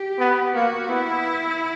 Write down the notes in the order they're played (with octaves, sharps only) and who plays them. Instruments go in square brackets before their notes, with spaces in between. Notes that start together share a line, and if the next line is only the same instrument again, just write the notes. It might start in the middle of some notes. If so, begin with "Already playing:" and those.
Already playing: [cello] G4
[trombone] B3
[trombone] A#3 [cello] F#4
[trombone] B3 [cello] E4